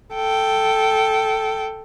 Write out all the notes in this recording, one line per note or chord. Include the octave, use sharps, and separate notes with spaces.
A4 G5